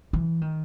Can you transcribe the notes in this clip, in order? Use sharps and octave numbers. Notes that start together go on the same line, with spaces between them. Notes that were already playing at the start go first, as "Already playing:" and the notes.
E3
D#3